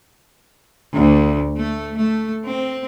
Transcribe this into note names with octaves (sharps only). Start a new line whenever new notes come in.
D2
A3
A3
C4